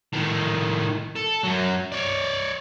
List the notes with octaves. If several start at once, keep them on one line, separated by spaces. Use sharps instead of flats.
A2 D#3
A4
F#2 F#3
C#5 D5